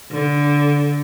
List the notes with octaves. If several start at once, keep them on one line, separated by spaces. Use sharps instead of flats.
D3